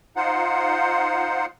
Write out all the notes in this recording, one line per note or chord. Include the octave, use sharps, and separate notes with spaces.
D#4 F4 C5 F#5